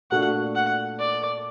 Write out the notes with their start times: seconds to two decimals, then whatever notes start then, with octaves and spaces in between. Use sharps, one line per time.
0.11 A#2 A3 D4 F#4 F#5
0.56 F#5
0.99 D5